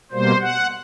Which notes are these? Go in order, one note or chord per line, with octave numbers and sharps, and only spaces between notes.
B2 G3 A#3 C5
F#5